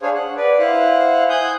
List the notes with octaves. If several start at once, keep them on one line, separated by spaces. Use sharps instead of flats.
D4 G#4 C5 C#5 F5
F#5
B4 D5
E4 C5 F5 F#5
G#5 D#6 F#6 G6